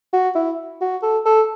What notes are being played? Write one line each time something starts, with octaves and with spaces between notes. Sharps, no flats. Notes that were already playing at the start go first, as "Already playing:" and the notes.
F#4
E4
F#4
A4
A4